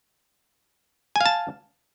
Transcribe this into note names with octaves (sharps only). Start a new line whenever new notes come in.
F5 G#5 A5